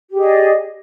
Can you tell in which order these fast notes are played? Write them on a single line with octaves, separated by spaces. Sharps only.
G4 G#4 D#5 D5